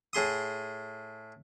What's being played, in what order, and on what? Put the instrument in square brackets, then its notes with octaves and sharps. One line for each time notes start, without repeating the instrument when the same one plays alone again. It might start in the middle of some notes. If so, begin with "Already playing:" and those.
[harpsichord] A2 G#4 C6 D#6